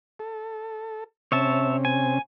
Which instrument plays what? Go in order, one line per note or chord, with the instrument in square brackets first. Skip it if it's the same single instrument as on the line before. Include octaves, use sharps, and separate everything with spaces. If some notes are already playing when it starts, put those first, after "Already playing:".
[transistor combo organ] A4
[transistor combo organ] C3 C4 C#4 [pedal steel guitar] C#5 E5 A5
[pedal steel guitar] G#5